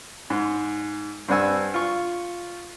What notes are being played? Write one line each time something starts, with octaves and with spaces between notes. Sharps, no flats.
G#2
G2 C4 D4 F#5 G#5 E6
F4 C#6